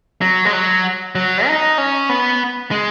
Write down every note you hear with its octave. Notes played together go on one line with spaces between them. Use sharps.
F#3
G#3
F#3
F#3
D#4
C#4
B3
G#3